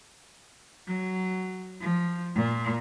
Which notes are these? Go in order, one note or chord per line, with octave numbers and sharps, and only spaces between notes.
F#3
F3
A#2